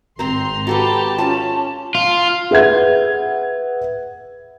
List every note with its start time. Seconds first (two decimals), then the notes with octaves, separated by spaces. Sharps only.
0.19 G#1 C4 C5 A#5 C6
0.67 F#4 G4 A4 B4 A5
1.18 C#4 F4 A5
1.95 F4
2.51 G#4 B4 E5 F#5 G#6